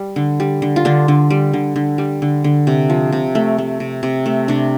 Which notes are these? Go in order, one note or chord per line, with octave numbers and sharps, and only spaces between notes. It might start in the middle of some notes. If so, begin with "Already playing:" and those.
Already playing: G3
D3
G3
D3
F4
D3 D4
D3
G3
D3
D3
G3
D3
D3
C3
F3
C3
A3
A3
C3
C3
A3
C3 D4